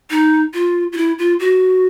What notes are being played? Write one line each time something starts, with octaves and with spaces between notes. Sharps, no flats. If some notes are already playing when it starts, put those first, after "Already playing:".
D#4
F4
F4
E4
F4
F#4